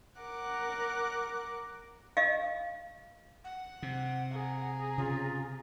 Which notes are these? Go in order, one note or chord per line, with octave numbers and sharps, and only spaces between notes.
A#4 F#5 D6 F#6
D#5 F5
F#5
C3
G#4 A#5
C#3 F4